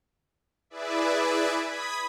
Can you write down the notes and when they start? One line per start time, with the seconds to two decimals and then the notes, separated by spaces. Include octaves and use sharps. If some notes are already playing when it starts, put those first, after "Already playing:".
0.70 E4 G#4 B4 D5 E5
1.61 B5 D#6 G#6 B6